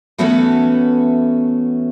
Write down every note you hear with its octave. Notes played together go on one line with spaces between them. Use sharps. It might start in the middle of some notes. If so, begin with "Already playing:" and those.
E3 A3 B3 C#4 F#4 A4